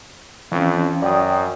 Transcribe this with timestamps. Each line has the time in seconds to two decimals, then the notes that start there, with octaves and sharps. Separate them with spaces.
0.52 F2 E3 C#4
1.02 F#2 D5 G5 D#6